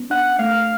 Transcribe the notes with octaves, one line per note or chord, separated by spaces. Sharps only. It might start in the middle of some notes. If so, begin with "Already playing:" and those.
Already playing: B3 C#4
D4 F#5
A3 F5